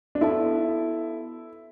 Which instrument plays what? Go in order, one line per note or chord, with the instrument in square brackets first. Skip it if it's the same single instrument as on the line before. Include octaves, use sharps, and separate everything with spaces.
[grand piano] D4
[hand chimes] B3 F#4 A4 E5 A5 [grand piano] E4